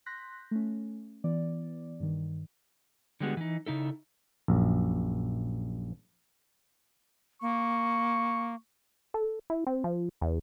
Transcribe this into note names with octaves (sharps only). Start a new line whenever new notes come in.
C6 F#6 G6 A#6 B6
A3 C#4
E3 B3 D5
G2 D#3
D3 G3 G#3 B3 F#4
E3 D#4
C#3 D#4 E4 A4
A#1 F#2
A#3 C#6
A4
E4
C4
F3
E2